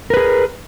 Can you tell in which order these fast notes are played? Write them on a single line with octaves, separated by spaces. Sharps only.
A#4 B4 G#4